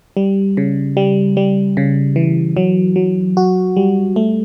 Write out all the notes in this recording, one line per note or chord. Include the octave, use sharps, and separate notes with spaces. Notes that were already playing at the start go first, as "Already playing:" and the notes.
G3
C#3
G3
G3
C#3
E3
F#3
F#3
F#4
G3
A3